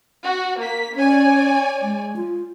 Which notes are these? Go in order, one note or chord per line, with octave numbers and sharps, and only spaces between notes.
F#4
A#3 B6
C#4 C#5 D5 G#5
G#3
F4